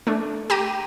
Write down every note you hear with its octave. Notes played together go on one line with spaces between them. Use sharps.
A3 D4
G4 A#5 D#7